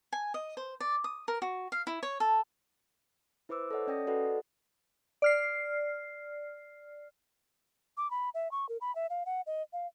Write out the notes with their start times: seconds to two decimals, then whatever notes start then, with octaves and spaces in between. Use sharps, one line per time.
0.13 G#5
0.34 D#5
0.57 C5
0.80 D5
1.04 D#6
1.28 A#4
1.42 F#4
1.72 F5
1.87 E4
2.03 C#5
2.20 A4
3.49 E4 B4 C5 D6 E6
3.71 A4 C#5 D#5 F#5
3.87 C#4 D5 G5 D#6 A#6
4.07 F#4 A4 B4 D5 D#5 F#5
5.22 D5 F6 C7
7.97 D6
8.11 B5
8.34 E5
8.51 C#6
8.69 A#4
8.81 B5
8.95 E5
9.10 F5
9.26 F#5
9.46 D#5
9.73 F5